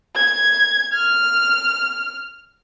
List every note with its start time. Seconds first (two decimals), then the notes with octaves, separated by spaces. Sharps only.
0.15 G#6
0.94 F6